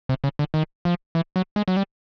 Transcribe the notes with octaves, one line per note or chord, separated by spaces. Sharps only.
C3
C#3
D3
D#3
F3
E3
F#3
G#3
F#3
G3